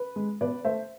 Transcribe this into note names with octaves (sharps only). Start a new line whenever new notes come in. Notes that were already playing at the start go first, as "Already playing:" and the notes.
Already playing: B4
G#3
B2 B4 D5
A3 C5 E5